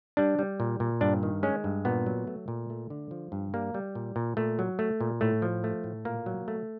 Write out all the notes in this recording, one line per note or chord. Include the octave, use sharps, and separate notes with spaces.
G3 D4
G3
A#2
A#2
G2 D4
D#3
G#3 C#4
G2
A#2 B3
F#3
A3
A#2
A3
D3
F3
G2
G3 A#3
G3
A#2
A#2
A#2 A3
F#3
A3
A#2
A2 A3
F3
A3
A2
A#2 A#3
F#3
A3